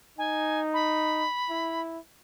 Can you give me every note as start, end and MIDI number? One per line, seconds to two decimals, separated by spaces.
0.18 1.26 63
0.18 0.60 80
0.74 1.81 83
1.50 1.99 64